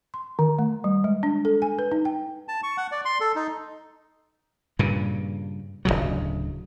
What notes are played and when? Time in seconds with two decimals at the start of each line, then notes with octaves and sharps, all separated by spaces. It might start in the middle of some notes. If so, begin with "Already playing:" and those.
0.14 C6
0.39 D#3
0.59 A3
0.84 G3
1.04 G#3
1.23 D4
1.45 A4
1.62 G#5
1.79 B4
1.92 D#4
2.05 G5
2.48 A5
2.63 C#6
2.77 F#5
2.92 D5
3.05 C6
3.20 A4
3.36 D#4
4.79 G2 A#2 C#3
5.85 D1 C2 C#3 F#3